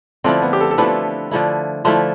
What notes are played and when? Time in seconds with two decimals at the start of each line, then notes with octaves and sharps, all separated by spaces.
0.24 D3 F3 A3 C4 E4
0.42 B3
0.53 G4
0.60 A4
0.71 A4
0.78 D3 F3 A3 E4 B4
1.31 D3 F3 A3 E4
1.85 D3 F3 A3 E4 C5